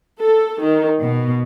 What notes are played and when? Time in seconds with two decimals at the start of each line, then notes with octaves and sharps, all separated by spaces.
0.21 A4
0.62 D#3
1.01 B2